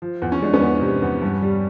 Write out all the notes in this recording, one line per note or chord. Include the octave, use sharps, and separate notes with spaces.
F3
E2
C#4
G#3 D4
B3 C#4
E2
C3
E2
G2
G3